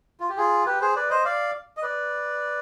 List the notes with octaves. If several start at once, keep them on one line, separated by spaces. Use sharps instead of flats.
F4
G4
F4 G#4
G4 B4
G#4 C5
B4 D5
C5 D#5
D5 F5
D#5
B4 D5